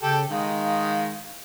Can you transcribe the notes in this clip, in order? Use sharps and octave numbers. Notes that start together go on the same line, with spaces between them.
C#3 G4 A4 G5
D#3 G#3 F5